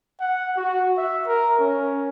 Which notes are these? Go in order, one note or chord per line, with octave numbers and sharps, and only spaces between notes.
F#5
F#4
E5
A#4
C#4